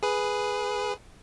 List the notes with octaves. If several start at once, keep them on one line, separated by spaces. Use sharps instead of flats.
G#4 B4